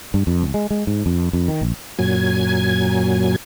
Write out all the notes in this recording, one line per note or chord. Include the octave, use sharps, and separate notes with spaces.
G2
F2
C#2
G#3
G#3
G#2
F2
F2
D#3
A#1
F#2 A#2 F#3 G#5 G#6